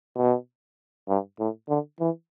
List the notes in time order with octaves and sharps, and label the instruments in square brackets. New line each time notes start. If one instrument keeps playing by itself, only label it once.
[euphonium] B2
G2
A2
D3
E3